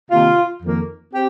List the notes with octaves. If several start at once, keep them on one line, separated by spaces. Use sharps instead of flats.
C3 D#3 A#3 F4
F2 D#3 A#3
C4 G4